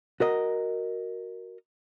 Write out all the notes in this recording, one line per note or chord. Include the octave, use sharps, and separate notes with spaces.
F#4 A#4 D#5